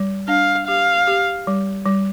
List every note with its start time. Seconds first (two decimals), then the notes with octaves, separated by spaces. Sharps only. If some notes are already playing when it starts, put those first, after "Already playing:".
Already playing: G3
0.28 D4 F5
0.67 G4 F5
1.08 G4
1.47 G3
1.86 G3